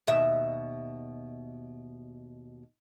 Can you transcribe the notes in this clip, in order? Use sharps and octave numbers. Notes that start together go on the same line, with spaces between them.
D#2 B2 E5